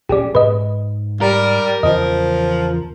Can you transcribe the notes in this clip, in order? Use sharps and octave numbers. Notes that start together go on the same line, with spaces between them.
A#1 F#3 C#4 G4 G#4 D5
G#2 B4 D#5
G3 A#4
E2 C#3 E3 F3 D#5